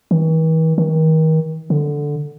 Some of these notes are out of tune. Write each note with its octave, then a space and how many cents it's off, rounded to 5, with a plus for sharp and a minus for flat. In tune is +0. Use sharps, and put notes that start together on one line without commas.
E3 -45
D#3 +35
D3 +0